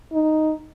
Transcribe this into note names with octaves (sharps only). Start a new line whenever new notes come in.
D#4